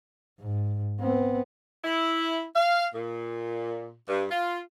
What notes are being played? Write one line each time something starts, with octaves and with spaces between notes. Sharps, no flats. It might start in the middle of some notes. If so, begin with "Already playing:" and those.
G#2
B3 C4
E4
F5
A#2
G2
F4